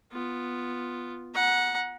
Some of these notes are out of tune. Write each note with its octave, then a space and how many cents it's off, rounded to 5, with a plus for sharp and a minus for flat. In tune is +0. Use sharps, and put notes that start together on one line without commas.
B3 +0 F4 +0
F#5 -10 A#5 +30